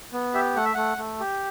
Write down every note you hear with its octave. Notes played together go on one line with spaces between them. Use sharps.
B3
G4 E5
A3 F#5
E5
A3 F#5
A3
G4